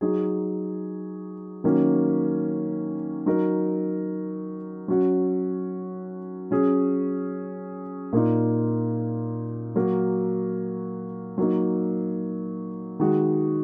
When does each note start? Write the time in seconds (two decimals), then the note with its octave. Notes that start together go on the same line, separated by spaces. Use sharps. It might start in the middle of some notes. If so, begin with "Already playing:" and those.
0.01 F#3 D#4 G#4
1.64 D#3 F#3 A#3 C#4
3.26 F#3 D#4 A#4
4.88 F#3 C#4 F#4
6.51 F#3 C#4 G#4
8.13 A#2 A#3 D#4
9.76 F#3 A#3 F#4 A#4
11.38 F#3 A#3 D#4
13.00 D#3 G#3 F#4